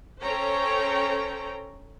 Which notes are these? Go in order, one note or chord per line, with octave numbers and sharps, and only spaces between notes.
C#4 A4 C5 C#5 G5 A#5